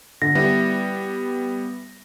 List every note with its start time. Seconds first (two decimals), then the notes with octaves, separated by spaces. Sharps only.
0.22 D3 A#6
0.35 G3 B3 E4